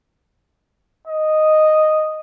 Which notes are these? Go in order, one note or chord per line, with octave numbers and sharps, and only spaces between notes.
D#5